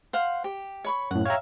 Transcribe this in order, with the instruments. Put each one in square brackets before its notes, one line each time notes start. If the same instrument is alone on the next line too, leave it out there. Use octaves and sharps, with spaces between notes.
[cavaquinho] C5 F5 F#5
G4
C#5 B5 C#6
[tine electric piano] F#2 A2 [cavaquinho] F#5
[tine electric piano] C#5 G5 A#5 [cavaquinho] E5 F5